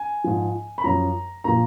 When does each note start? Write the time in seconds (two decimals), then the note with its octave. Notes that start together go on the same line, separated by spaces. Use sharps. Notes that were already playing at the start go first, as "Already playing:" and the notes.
Already playing: G#5
0.24 G#2 F3
0.78 B5
0.84 F#2 F3 A#5
1.44 A#2 F3 A#5